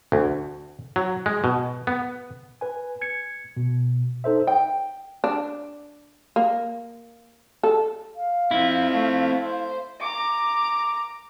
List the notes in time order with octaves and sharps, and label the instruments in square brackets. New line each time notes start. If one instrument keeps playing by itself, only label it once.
[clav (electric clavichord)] D2
F#3
G#3
B2
B3
[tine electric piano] B4 G#5
G#6 C#7
B2
D#4 A4 C5 E5
[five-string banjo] G5
[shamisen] D4
A#3
A4
[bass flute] F5
[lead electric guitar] C4 F4 [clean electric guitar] E4
[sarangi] A3
C5
[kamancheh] A#5 D6